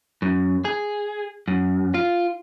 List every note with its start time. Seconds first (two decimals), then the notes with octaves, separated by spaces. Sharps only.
0.22 F#2
0.65 G#4
1.48 F#2
1.94 F4